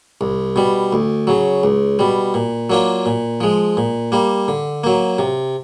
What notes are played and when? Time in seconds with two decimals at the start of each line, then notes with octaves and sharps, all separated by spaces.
0.21 C2
0.56 B2 G3
0.92 D2
1.27 C#3 F#3
1.63 C#2
1.99 B2 G3
2.34 A#2
2.70 F#3 A#3 D4 F4
3.06 A#2
3.41 F3 G#3
3.77 A#2
4.12 G3 A#3
4.48 D3
4.84 F#3 A#3
5.19 C3